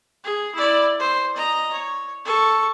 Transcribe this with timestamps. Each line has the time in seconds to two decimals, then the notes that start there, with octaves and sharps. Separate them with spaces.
0.24 G#4
0.55 E4 D5
0.99 C5
1.36 D#5 A#5
1.73 C#5
2.25 A4 C#6